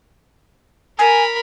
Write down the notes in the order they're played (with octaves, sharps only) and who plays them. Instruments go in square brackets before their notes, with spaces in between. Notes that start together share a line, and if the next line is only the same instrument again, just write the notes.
[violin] A#4 B5 [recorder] G#5